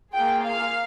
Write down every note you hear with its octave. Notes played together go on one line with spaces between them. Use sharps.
A#3 F4 G#4 G5
F5